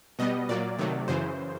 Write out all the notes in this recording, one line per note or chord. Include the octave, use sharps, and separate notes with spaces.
B2 G3 B3 D#5
A#2 F#3 A#3 D5
C3 D#3 F#3 A3
F#2 C#3 E3 C5